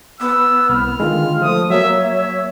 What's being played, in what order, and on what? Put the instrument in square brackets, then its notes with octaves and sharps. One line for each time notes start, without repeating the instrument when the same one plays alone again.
[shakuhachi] B3 [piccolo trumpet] E6
[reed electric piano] C2 [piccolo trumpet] F6
[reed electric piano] D3 D#3 G#3 [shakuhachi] F4
[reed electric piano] F3 A3 [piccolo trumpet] D#6
[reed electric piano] F#3 A#3 [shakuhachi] C#5 [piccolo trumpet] E5
[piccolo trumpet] E5